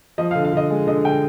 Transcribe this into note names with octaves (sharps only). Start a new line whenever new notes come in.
F3 D#5
D3 F5
F5
D3 D#5
G#3
D3 D#5
D3 G5